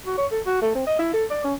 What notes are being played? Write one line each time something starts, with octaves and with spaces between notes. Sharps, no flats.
F#4
C#5
A4
F#4
A3
C4
D#5
E4
A4
D5
C#4